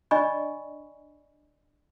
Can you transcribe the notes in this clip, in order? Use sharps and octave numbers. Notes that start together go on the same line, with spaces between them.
D4 D5 D#5 G#5 B5 C#6